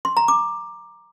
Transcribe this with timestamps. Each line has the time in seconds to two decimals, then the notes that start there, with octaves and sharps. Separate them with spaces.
0.05 C6
0.17 A#5
0.28 D6